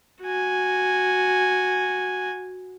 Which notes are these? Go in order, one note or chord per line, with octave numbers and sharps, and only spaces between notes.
F#4 G#5